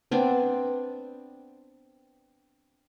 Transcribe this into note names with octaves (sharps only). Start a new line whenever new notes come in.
B3 C4 D4